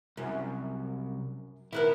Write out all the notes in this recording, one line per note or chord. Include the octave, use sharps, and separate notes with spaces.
C2 F#2
D#3 B3 E4 A#4